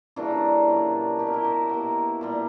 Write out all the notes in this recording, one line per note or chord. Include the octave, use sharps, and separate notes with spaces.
C#3 E3 G3 A#3 D4 F#4
A#2 F#3 A#3
B2 F#3 A#3 G4
A#4
E4 G4
F#4 A#4
B2 A#3
A#2 G3 A#3